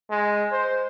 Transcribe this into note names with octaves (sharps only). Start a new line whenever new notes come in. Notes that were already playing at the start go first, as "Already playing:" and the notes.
G#3
C5